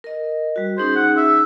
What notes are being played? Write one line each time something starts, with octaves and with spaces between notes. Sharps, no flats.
A#4 D#5
G3 F#4
C#4 D#4 G#4 C5
F#5
E5